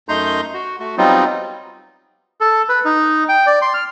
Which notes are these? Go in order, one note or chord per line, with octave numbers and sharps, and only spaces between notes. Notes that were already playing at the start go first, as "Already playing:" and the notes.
F#2 A3 D#4 A#5 C6 G6
F#4
A3 F#4
F#3 G3 B3 C4 D#4 F4
A4
B4
D#4
G5
D5
C6
F6